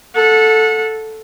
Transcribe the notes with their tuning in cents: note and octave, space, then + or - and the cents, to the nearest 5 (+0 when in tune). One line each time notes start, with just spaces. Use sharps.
A4 +0 F#5 -30